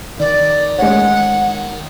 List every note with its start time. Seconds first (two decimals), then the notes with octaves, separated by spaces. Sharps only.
0.20 D#3 D5
0.79 G#3 C#5 F#5